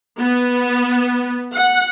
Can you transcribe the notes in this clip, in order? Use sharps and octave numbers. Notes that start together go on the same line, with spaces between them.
B3
F#5